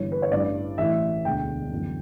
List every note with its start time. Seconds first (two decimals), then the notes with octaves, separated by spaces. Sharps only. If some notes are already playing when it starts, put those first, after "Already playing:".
Already playing: G1 G2 E3 C#5
0.12 B4
0.22 C#5
0.31 A1 G2 E3 D5
0.78 A1 A2 E3 E5
1.24 E1 D2 D3 G5
1.71 G1 F#2 E3